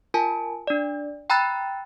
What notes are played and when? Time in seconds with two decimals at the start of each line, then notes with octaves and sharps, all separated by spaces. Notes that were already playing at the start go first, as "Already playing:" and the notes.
0.14 F4 A#4 G#5 A5
0.67 D4 D5
1.30 G5 A#5 B5 E6 F#6 A6